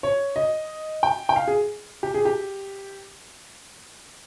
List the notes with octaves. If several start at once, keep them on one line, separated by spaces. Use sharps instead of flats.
C#5
D#5
G5
G5
F5
G#4
G4
G#4
G4